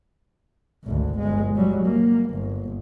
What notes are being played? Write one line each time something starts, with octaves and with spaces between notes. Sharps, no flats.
G#1 D2
G1 G#3
F#3 G3
A#3
G1